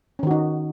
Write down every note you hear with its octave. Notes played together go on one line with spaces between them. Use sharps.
D#3 C#4 D#4 F#4